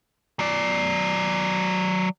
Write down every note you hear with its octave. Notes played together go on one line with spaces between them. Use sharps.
F#3 D5